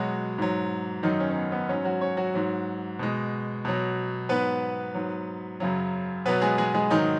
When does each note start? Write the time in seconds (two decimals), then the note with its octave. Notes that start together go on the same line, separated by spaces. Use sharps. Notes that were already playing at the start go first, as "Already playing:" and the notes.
Already playing: B2 F#3 G#3 F#4
0.38 G#2 F#3
1.03 F#2 D#3 F#3 D#4
1.20 C#4
1.30 C#4
1.36 B3
1.52 B3
1.69 G#2 F#3 C#4
1.84 F#3 F#4
2.01 C#4 C#5
2.17 F#3 F#4
2.34 G#2 F#3
2.99 B2 G#3
3.65 B2 F#3
4.29 G#2 F#3 B3 B4
4.94 G#2 F#3
5.60 F#2 C#3 F#3
6.25 B2 F#3 B3 B4
6.42 G#3 G#4
6.58 G#3 G#4
6.74 G#3 G#4
6.90 G#2 D#3 F#3 D#4